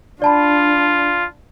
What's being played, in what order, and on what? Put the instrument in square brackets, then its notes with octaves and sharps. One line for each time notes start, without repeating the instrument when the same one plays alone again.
[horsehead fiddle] D4 [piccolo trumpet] F4 [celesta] D5 A5 B5